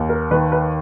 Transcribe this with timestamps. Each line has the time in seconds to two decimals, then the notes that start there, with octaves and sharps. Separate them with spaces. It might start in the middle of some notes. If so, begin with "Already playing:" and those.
Already playing: D#2
0.09 A#4
0.31 D#3 B4
0.52 B4